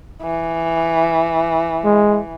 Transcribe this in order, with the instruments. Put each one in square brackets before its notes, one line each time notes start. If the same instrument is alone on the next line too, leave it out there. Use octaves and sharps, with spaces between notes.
[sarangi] E3
[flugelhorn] G#3